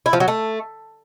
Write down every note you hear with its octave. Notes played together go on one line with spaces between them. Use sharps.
E4
F3
F#3
A3